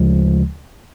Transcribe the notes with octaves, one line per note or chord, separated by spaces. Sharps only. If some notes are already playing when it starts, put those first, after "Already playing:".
Already playing: D2 C#3 F3 G#3